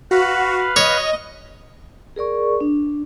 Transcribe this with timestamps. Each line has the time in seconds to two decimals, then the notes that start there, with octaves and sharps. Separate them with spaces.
0.11 F#4 B4 F5 B5
0.76 C#5 D#5
2.16 G#4 A#4 D5 C#6
2.61 D4